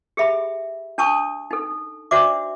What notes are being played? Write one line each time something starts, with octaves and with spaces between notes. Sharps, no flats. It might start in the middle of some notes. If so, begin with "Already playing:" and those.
G4 G#4 E5 B5
D4 A5 C#6 D#6
D#4 A4
D4 F#4 C5 D5 E5 D6